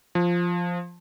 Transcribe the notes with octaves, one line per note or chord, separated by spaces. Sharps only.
F3